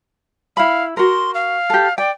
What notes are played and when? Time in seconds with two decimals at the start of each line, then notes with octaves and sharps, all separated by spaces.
0.57 E4 F5 B5
0.97 F#4 A#4 C6
1.35 F5
1.70 G4 A4
1.98 D5 G5